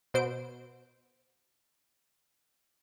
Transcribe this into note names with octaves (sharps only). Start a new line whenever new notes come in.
B2 C5 D7